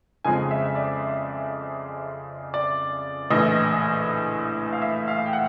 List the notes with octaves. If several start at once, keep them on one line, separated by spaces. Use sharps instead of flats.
F2 C#3 F3 G#3 C4 G#5
E5
D5
D5
A#1 A2 E3 D#5
F5
E5
F5
G5
F#5